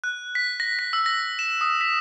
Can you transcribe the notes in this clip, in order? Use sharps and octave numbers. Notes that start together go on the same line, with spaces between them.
F#6
B6
A#6
B6
E6
A#6
E7
D#6
B6